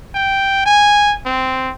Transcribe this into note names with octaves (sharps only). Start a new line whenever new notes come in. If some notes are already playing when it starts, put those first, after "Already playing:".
G5
G#5
C4